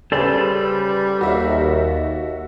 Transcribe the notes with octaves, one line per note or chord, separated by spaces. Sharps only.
C#3 G3 G#4 A4 B4 C5 D5
D#2 F#4 E5